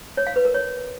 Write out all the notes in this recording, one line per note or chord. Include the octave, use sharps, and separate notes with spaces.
C#5
F5
B4
A#4
C#5